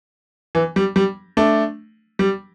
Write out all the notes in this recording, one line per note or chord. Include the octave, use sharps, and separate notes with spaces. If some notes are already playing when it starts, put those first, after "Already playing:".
E3
G3
G3
A3 D4
G3